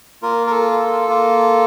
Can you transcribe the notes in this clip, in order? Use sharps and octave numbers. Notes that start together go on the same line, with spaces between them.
A#3 F4 A#4
A#4
A4
A4
A#3 F4